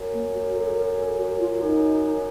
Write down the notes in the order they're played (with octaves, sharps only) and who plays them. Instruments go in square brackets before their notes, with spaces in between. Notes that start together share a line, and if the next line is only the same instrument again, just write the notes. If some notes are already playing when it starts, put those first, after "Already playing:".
Already playing: [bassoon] F#2
[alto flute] A#3
F#4
A4
A#4
A4
F#4
F4
[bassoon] F#2 [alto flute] D#4